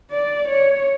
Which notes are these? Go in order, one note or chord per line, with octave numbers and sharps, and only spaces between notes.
D5
C#5